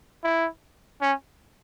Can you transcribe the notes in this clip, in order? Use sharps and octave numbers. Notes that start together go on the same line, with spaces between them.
E4
C#4